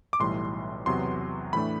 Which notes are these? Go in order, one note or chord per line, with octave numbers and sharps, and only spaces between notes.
D6
B1 A2 E3 G3 C6
E2 C3 F#3 B3 C6
A2 E3 A3 D4 B5